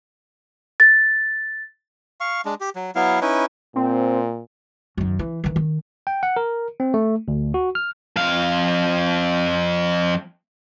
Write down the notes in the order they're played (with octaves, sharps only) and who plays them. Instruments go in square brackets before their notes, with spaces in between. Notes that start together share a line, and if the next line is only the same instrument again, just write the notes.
[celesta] A6
[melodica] F5 C#6
G#3 D4
G4
F#3
F#3 B3 E4 F5
C#4 D#4 E4 B4
[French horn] A#2 [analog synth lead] C4
[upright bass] F#2 D#3
E3
D#3 E3
D#3
[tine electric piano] G5
F#5
A#4
C4
A3
D2
F#4
F6
[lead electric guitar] F2 F5